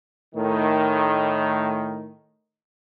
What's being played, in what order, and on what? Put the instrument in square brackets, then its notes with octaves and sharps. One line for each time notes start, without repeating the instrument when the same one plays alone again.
[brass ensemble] A2 D#3